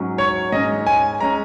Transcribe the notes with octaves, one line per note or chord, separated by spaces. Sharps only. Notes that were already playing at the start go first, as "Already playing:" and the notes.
Already playing: G#2 F#3 C#4
C#5
G#2 G#3 C#4 D#5
G#5
G#3 C#4 A#5